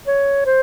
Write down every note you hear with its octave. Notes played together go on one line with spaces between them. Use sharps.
C#5
C5